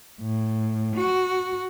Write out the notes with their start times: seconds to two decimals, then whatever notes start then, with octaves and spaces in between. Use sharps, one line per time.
0.22 A2
0.96 F#4